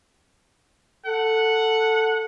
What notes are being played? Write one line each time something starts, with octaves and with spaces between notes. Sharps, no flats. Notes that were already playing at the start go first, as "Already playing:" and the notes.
A4 F#5